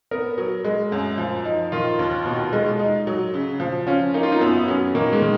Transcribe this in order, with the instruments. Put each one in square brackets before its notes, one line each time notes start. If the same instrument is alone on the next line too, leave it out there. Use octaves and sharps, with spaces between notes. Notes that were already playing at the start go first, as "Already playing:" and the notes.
[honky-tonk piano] B3 [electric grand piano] A#4
[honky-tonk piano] F#3
G#3
F#2
F3
D#4
[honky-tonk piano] D#3 [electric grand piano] F4
[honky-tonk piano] D#2
B2
G#3
D#4
F#3
C#3
F3
[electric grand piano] C#4 [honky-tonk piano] F4
[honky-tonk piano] A#3 [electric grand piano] D#4
[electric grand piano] F4
D#4
[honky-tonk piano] F#2 [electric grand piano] B3
[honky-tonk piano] F#3 [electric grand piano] C#4
[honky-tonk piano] D#3 [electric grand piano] A#3
[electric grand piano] G#3
[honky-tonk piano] D#3